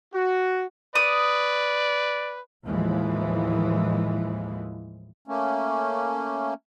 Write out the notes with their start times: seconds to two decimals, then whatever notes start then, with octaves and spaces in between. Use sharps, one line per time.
0.14 F#4
0.95 B4 D5 D#6
2.66 D#2 A2 E3 F3 G#3
5.28 A3 A#3 C#4